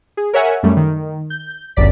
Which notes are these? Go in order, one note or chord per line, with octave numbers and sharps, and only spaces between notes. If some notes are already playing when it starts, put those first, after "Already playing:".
G#4
A#4 C#5 E5 F#5 G#5
F#2 G3 A3
D#3
G6
G1 C#2 F#2 D5 B6